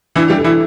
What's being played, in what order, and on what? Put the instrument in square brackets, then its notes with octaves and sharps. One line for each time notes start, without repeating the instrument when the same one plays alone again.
[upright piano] E3 E4 [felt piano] D4
[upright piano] G3 G4
[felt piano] A4
[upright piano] E3 E4